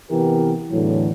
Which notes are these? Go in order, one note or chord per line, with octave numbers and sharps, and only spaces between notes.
C3 E3 B3 E4 G4 A#4
E2 A2 D3 E3 F#3